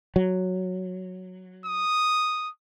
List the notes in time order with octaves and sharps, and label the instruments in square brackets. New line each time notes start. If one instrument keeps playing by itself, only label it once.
[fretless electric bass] F#3
[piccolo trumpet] D#6